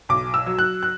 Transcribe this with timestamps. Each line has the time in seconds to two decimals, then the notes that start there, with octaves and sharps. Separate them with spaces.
0.09 B1 D6
0.34 E6
0.46 F#3
0.59 F#6
0.83 F#6